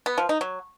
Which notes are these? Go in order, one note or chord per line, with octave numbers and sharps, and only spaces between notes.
B3
F3
D#4
F#3